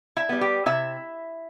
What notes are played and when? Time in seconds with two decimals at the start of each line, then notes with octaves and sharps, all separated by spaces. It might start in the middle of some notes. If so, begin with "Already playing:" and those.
0.17 E4 E5
0.29 G3 B3
0.41 G4 G5
0.66 C3 E4 E5